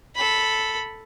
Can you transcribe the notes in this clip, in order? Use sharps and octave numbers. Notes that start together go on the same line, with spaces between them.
A4 B5